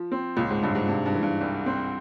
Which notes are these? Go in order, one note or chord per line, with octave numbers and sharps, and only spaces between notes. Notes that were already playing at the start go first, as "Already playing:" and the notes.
Already playing: F3
C4
C#2 A#2
G#2
C#2 G2
G#2
G2 C3
G2
E3
G2
C2
C4